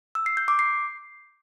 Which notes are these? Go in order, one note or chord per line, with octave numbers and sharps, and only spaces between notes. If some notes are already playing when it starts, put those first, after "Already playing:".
E6
C7
G6
D6
C7